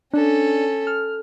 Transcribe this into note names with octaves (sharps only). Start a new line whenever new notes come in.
C#4 D4 A4
F6